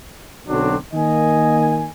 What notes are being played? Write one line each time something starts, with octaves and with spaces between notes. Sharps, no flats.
B1 D3 F#3 C4 D4
D#3 A#3 D#5 G#5